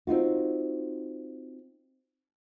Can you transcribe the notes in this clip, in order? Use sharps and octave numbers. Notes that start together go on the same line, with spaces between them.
C4 D#4 F4 F#4